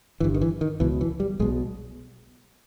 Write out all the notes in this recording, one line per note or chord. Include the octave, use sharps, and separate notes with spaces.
G1 G2 E3
D#3
E3
D#3
C#2 B2 E3
E3
G3
B1 B2 G#3